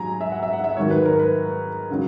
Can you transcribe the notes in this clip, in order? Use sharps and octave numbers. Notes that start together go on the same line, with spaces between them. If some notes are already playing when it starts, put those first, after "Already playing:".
Already playing: G#2 F#3 G#5 A#5
E5
F#5
E5
F#5
E5
G#2 D#3 F#3 C#5
B4
A#4
B4
C#3 F#3